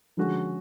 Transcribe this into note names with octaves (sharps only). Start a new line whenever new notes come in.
D3 F3 G#3 C#4 F#4